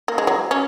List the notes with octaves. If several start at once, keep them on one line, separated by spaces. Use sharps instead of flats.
A#3
G#3
F#3
C#4